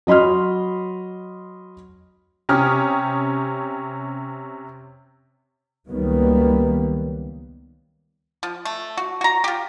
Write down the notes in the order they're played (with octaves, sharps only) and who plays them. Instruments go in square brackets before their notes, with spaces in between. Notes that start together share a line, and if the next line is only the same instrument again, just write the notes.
[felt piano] F#3 D#5 B5 C6 F6
[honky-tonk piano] C3 C#4 G4 D#6 F6
[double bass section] C#2 D#3 F#3 G3 A#3 B3
[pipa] F3
A3
F#4
F#4 A#5
F4 G4